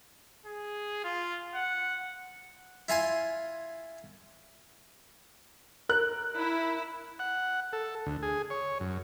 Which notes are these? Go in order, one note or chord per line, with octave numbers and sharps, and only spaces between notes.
G#4
F4
F#5
E4 F4 G#5 C6
A#4 F#6
E4
F#5
A4
D2
G#4
C#5
F#2